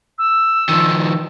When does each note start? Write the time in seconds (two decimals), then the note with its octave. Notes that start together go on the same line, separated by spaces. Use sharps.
0.18 E6
0.69 D#3 F3